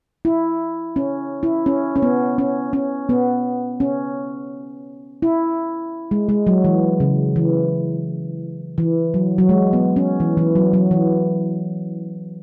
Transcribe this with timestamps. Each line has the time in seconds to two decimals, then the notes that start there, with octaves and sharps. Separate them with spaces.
0.25 E4
0.96 C#4
1.43 E4
1.66 C#4
1.96 C#4
2.02 B3
2.38 C#4
2.73 C#4
3.09 B3
3.80 C#4
5.22 E4
6.11 G#3
6.29 G#3
6.47 F#3
6.65 E3
7.00 C#3
7.36 E3
8.78 E3
9.14 F#3
9.38 F#3
9.49 G#3
9.73 B3
9.96 C#4
10.20 E3
10.37 E3
10.55 F#3
10.73 F#3
10.91 E3